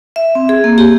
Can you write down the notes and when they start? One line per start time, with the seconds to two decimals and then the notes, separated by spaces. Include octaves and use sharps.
0.16 E5
0.35 C4
0.49 G#4
0.64 A#3
0.78 G4